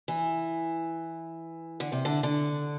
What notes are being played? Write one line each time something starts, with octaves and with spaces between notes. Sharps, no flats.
E3
D3
C3
D3
D3